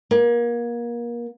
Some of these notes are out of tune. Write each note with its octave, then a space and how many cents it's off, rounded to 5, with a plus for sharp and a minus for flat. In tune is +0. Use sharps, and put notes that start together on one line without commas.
A#3 +30